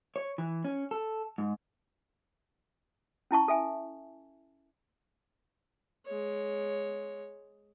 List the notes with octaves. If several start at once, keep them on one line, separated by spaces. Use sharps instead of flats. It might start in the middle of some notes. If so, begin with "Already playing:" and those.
C#5
E3
C#4
A4
G#2
C#4 E4 A5 C#6
A4 E5 G#5
G#3 C#5